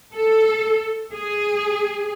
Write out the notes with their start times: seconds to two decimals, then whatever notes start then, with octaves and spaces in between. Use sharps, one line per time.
0.15 A4
1.12 G#4